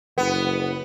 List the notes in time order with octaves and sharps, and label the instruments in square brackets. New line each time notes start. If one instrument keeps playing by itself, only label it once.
[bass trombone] F#1 [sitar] B3